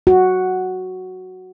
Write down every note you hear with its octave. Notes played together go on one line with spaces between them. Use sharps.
F#4